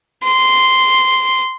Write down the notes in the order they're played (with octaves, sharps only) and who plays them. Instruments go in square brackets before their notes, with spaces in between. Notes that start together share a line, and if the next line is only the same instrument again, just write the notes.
[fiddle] C6